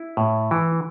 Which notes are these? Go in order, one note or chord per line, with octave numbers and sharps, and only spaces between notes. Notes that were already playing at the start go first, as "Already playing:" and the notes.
Already playing: E4
A2
E3